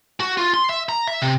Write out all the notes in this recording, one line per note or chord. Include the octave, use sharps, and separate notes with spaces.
F#4
F4
C6
E5
A#5
E5
C3